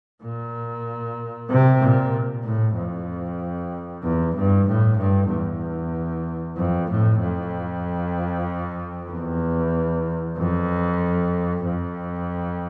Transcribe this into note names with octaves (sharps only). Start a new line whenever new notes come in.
A#2
C3
A#2
A2
F2
E2
G2
A2
G2
E2
F2
A2
F2
E2
F2
F2